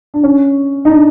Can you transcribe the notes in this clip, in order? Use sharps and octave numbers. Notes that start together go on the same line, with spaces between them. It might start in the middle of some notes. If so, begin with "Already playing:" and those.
D4
C#4
D#4
D4